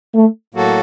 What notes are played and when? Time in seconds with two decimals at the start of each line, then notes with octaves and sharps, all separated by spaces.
0.14 A3
0.54 A2 F#3 A#3 F#4 A4